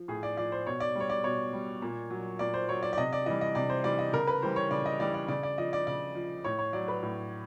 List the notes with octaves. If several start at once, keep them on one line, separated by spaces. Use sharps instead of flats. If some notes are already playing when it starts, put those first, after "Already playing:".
Already playing: F3
A2 G#4
D5
F3 D5
C5
B2 C#5
D5
G3 C#5
D5
B2 C#5
G3
A#2
F#3
A#2 D5
C5
F#3 C#5
D5
D5
C3 D#5
D5
E3 G3 D#5
D#5
C3 D5
C5
E3 G3 D5
D#5
C#3 A#4
B4
E3 G3 C5
C#5
C#3 D5
D#5
E3 G3 D5
D5
C#3 D5
D5
F3 D#5
D5
C#3 D5
F3
A2 C#5
C#5
F#3 D5
B4
A2